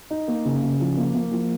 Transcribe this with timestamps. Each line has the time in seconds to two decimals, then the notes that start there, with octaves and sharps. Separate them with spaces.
0.11 D#4
0.28 A#3
0.45 C#3
0.63 C#3
0.80 F3
0.97 A#3
1.15 A#3
1.32 F3